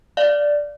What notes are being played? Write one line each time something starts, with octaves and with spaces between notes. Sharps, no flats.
D5 F5